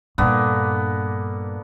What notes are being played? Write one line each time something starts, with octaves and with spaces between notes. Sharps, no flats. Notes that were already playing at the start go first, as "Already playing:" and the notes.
G2 A#2 D3 A#3 B3